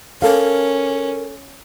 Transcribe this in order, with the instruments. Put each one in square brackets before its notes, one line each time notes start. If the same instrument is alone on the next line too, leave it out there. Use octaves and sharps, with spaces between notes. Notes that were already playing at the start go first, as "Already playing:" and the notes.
[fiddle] C#4 [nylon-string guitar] A4 F5 [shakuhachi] A#4